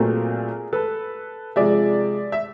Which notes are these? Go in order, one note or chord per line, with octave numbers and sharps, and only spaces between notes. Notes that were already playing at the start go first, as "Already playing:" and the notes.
Already playing: A#2 F#3 A3 C4 G#4 A#4
A4 B4
C3 F3 G#3 D5 E5
E5